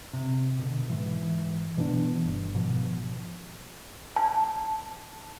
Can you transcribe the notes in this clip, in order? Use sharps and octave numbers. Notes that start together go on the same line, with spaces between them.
C3
B2 D3
G#2 E3
B2 E3 B3 D4
G1
G#2 B2 D#3 F3
A5